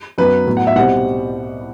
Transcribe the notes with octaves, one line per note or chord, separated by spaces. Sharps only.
F#2 F#3 B3 B4
A2 F#3 B3
F#5
E5
C2 B2 G3 C4 F#5